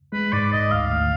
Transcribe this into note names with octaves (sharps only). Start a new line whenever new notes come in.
G#3 B4
G#2 D5
G#1 D#5
D2 F5
D2